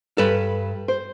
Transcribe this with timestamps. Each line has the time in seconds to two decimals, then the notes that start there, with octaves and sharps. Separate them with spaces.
0.18 G2 A4 B4
0.88 C5